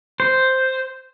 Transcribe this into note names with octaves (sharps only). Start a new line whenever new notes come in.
C5